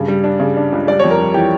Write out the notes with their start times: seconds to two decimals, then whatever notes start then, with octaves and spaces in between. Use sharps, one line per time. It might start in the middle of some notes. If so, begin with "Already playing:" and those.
Already playing: G2 C#3
0.08 G3
0.24 D4
0.40 C#3
0.57 D4
0.72 C#2
0.87 G3 D5
0.99 C#5
1.04 F2
1.11 A#4
1.19 G3
1.34 E3 G4